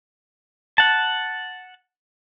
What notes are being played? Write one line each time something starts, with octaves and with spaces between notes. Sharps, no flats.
F#5 A5